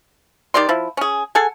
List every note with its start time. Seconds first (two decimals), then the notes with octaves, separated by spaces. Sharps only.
0.54 D#3 G4 D5 C6
0.69 F3 E4
0.97 C#4 G#4
1.35 G#4 A4 F#5 G#5